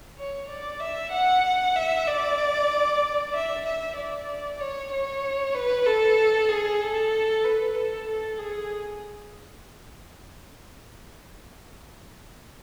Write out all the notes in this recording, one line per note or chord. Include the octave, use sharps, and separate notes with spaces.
C#5
D5
E5
F#5
E5
D5
E5
E5
D5
C#5
C#5
B4
A4
G#4
A4
B4
A4
A4
G#4